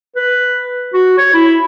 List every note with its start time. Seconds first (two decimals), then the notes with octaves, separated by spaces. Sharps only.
0.16 B4
0.94 F#4
1.18 C#5
1.34 E4